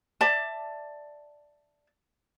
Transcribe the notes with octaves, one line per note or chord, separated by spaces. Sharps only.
D5 E5 A5